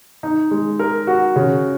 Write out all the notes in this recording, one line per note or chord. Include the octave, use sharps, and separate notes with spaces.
D#4
G#3
A#4
F#4
C#3